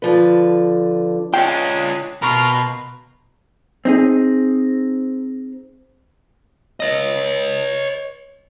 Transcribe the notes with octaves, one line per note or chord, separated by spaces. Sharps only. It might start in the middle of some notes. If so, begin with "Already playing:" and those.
D3 F3 B4
C#3 G#3 D4 F4 C#5 G5
B2 F4 A#4 A#5 B5 C#6
C4 D#4 G#4
C#5 D#5